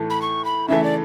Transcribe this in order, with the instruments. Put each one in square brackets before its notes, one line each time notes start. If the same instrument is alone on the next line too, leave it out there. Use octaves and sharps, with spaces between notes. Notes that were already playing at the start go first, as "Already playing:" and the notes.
Already playing: [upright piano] A2 E3 A3
[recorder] B5
C#6
B5
[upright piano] C#3 E3 A3 [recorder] E5
[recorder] D5